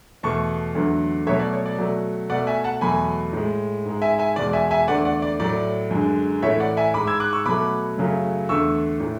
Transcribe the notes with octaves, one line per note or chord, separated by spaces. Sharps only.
E2 B2 A3 A5 C#6
E2 D3 F#3 A3
B2 F#3 A3 C#5 E5
D5
C#5
D5
B2 F#3 A3
B2 A3 D5 F#5
E5 G#5
F#5 A5
E2 B2 F#3 A3 G#5 B5
A2 G#3
G#2 G#3
E5 G#5
E5 G#5
E2 B2 G#3 D5
E5 G#5
E5 G#5
E2 D3 A3 D5 F#5
D5 F#5
D5
A2 F#3 A3 D5
F#2 D3 G#3
A2 E3 A3 C#5 E5
D5 F#5
E5 G#5
G#2 G#3 B5 D6
E6 G#6
D6 F#6
C#6 E6
B2 F#3 A3 B5 D6
F#2 C#3 F#3 A3
E2 D3 A3 C#6 E6
A2 E3 A3